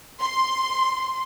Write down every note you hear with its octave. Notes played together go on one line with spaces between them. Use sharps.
C6